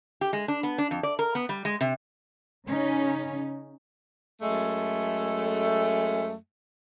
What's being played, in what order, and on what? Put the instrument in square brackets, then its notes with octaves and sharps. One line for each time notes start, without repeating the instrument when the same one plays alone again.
[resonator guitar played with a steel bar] G4
G#3
D4
B3
D4
F2
D5
A#4
B3
G3
G#3
C3
[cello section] C#3 C#4 D#4
[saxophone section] F#2 G#3 A3